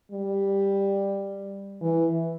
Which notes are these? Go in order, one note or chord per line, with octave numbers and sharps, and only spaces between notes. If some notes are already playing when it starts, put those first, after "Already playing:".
G3
E3